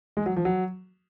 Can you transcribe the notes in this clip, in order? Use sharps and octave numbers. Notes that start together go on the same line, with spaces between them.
G#3
F#3
F3
F#3